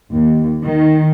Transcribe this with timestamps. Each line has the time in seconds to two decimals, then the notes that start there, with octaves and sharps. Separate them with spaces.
0.12 D#2
0.63 D#3